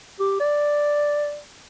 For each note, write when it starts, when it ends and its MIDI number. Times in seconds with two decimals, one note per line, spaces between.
0.20 0.37 67
0.40 1.40 74